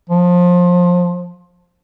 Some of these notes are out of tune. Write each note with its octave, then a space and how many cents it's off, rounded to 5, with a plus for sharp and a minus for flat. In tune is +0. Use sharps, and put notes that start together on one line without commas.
F3 +20